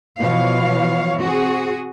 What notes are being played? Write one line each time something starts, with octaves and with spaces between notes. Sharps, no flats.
B2 E3 F3 C#5 F5
C4 F#4 G#4